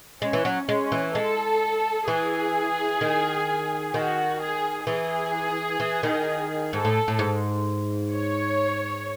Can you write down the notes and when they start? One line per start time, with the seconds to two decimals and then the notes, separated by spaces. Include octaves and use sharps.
0.22 G#3 C#4
0.33 E3
0.45 F#3
0.68 G#3 C#4
0.92 E3
1.15 G#3 A4
2.08 E3 G#4
3.01 D#3
3.93 D#3 F#4
4.40 G#4
4.87 E3 G#4
5.80 E3
6.03 D#3
6.73 G#2 A4
6.85 A2
7.08 A2
7.19 G#2
8.13 C#5